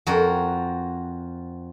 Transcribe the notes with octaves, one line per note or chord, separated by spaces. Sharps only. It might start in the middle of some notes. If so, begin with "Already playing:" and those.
F2 F#4 A#4